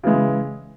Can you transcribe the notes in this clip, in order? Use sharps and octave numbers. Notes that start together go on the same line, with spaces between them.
C#3 E3 G#3 E4